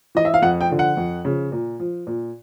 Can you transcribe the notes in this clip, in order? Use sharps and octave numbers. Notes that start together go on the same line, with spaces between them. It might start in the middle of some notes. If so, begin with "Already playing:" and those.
E3 D#5
E5
F5
F2 F#5
G5
D3 F3
F#5
F2
C#3 F3
A#2
F3
A#2